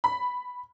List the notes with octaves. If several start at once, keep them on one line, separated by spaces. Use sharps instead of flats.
B5